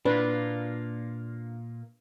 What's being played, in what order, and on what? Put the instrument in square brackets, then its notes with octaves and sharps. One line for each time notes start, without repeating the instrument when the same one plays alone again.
[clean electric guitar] A#2 A#3 F4 [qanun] D4 [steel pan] B4